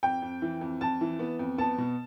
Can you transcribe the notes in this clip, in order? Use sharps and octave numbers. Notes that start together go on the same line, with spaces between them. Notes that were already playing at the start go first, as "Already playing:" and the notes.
F2 G5
F2
E3
F2
F2 A5
E3
B3
F2
B3 A5
B2